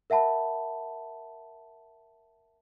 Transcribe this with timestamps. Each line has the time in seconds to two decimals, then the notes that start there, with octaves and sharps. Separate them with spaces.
0.10 A#4 E5 F#5 A5 B5